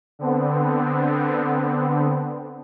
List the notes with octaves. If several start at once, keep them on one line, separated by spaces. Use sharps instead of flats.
D3 B3 C4